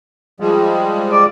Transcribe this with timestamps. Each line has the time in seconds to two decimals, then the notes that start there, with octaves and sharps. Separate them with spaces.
0.40 F3 G3 G#3
1.12 D5